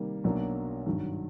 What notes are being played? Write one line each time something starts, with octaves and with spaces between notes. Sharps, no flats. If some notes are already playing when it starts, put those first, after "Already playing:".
Already playing: C3 D#3 G3 A#3
B1 B2 F#3 A#3 D4
G#1 G2 D#3 F#3